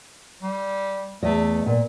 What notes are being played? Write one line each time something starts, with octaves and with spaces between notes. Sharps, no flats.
G3
E2 A3 D#5
A#2